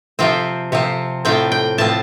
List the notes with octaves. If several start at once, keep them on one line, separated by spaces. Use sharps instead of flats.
C3 F3 C4 G5
C3 F3 C4
A2 F3 C4 G5
G5
A2 F3 C4 A5